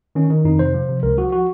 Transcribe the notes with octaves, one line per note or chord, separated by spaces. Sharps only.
D#3 C#4
D#3
F2 D#4
C3 C5
F3
C3
C#2 A#4
F3 F#4
F#4